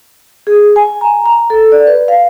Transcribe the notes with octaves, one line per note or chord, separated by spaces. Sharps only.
G#4
G#5
A#5
A#5
A4
D5
B4
F5